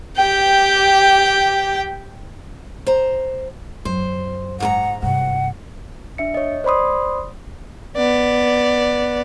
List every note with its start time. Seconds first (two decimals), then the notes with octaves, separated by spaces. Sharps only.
0.17 G4 G5
2.87 C5 A#5
3.85 F#2 F#3 C5
4.60 G#2 A#4 F#5 A#5
5.02 G2 C3 F#5
6.18 D4 E5 C#7
6.34 C#5 D#5
6.64 C5 D5 B5 C6 D#6
7.97 B3 D5